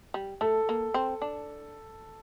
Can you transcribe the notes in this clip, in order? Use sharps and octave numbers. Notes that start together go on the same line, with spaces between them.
G3
A3 A4
A#3
C4
D4